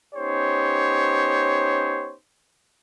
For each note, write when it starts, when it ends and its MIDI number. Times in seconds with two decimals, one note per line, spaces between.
0.15 2.15 59
0.15 2.15 61
0.15 2.15 63
0.15 2.15 67
0.15 2.15 72
0.15 2.15 73